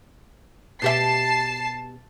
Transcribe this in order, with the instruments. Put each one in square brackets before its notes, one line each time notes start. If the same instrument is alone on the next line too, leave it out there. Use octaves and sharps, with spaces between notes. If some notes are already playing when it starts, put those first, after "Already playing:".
[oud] B2 G4 E5 [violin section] A5 C7